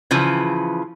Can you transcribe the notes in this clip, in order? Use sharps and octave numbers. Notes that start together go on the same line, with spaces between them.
C#3 E3 F3